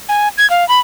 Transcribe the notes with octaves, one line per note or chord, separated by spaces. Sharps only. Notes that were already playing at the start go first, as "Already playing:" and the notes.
G#5
G#6
F5
B5